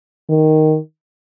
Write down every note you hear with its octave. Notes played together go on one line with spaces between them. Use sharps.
D#3